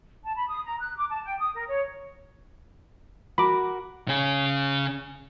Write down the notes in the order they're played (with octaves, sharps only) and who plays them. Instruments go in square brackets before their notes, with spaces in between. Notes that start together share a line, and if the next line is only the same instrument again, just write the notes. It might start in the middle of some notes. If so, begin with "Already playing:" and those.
[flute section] A5
B5
D#6
A#5
F#6
D6
A5
G5
D#6
A#4
C#5
[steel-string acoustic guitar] F#4 A#4 [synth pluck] B5 D6
[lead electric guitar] C#3 G#4